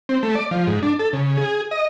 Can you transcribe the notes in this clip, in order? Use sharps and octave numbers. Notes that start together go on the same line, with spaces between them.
C4
A3
D5
F3
G#2
D4
A4
C#3
G#4
D#5